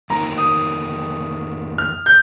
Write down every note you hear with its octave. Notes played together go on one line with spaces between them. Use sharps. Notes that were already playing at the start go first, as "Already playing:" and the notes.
F2 D#3 A#3 D#4 A#4 A#5
D#6
F6
G6